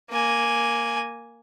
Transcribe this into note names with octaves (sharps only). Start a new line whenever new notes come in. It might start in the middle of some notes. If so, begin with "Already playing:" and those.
A#3 G#5